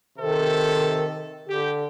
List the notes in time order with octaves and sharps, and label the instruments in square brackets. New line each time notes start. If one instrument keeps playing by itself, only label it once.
[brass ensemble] C3 A4 [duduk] D#3
[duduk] D3 [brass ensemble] G4